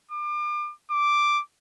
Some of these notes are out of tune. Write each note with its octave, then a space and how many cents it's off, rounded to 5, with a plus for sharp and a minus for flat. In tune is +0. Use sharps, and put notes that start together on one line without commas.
D6 +35
D6 +0